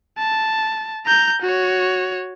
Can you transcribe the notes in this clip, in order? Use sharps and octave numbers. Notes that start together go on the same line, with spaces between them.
A5
A#5 G6
F#4 C#5